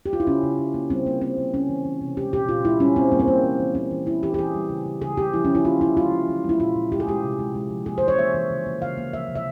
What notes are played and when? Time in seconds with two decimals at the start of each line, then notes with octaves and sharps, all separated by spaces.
0.06 G4
0.13 F4
0.20 E4
0.27 C#3 C#4
0.43 C#3
0.58 C#3
0.74 A#3
0.90 G3 C4
1.06 A#3
1.22 A#3 C4
1.38 A#3
1.53 A#3 C#4
1.69 E3
1.85 E3
2.01 C3
2.17 G#3 G4
2.33 A#2 G4
2.49 A#2 F4
2.64 G#3 E4
2.80 G3 C#4
2.96 G3 C4
3.12 G3 A#3
3.19 C4
3.28 G3 A#3
3.43 E3
3.60 E3
3.75 A#3 C4
3.91 E3
4.06 A#3 E4
4.23 E3 G4
4.34 G4
4.38 E3 G#4
4.54 G3
4.70 C#3
4.85 C#3
5.02 C#3 G#4
5.17 C#3 G4
5.33 F3 E4
5.45 F3 C#4
5.55 E4
5.65 A#3 F4
5.81 C3 E4
5.97 G#3 F4
6.12 E3
6.29 E3
6.44 G#3
6.49 E4
6.60 A#2 F4
6.76 A#2
6.92 G#3 G4
7.00 G#4
7.07 G#3 G4
7.24 C3
7.39 G#3
7.55 G#3
7.70 F3
7.86 A#3 G#4
7.98 E3 C5
8.08 C#5
8.18 A#3 E5
8.34 E3
8.50 C#3
8.66 A#3
8.82 C#3 F5
8.98 A#3
9.13 F3 E5
9.29 C3
9.35 E5